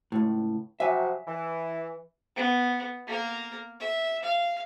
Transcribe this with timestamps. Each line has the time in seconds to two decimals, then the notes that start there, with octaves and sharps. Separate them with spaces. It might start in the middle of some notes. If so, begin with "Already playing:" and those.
0.12 C#2 A2
0.80 C3 F3 F#3 E5 G#5
1.27 E3
2.36 B3
3.07 A#3 A#4
3.80 E5
4.23 F5